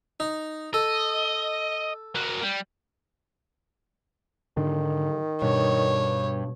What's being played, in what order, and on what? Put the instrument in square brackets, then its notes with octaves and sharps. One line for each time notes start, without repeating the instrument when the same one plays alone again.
[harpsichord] D#4
[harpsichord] A4 [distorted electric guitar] D#5
[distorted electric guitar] A#3 F#4
G3
[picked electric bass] G#2 D3 D4 [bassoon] D#3
[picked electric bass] G2 [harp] B2 [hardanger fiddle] C#5